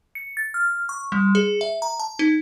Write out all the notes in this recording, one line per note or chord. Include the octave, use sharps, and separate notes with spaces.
C#7
A6
F6
C#6
G3
G#4
E5
A#5
A5
D#4